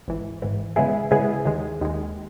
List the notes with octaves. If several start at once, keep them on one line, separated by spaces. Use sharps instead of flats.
G#1 G#2 E3
G#1 G#2 E3
C#3 G#3 B3 E4 G#4
C#3 G#3 B3 E4 G#4
D#2 D#3 G#3
D#2 D#3 G#3